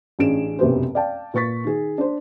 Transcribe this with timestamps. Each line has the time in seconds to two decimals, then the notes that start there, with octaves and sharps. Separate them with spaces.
0.19 A1 C#4 D4 G#4 D7 E7
0.59 F1 B1 F#2 G4 B4 C5
0.95 D5 F5 G5 A5
1.34 A#2 B4 C#6 A6 B6
1.65 D#3 G#4
1.98 D4 C5